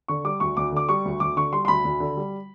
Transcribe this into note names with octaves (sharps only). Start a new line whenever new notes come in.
D3 C#6
G3 D6
D2 C#6
D2 D6
D3 D6
G3 C#6
D2
D2 D6
D3 C#6
G3 C6
C6
D2 B5
D2
D3
G3